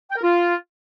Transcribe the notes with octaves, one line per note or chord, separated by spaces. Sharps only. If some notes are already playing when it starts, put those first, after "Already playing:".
G5
A#4
F4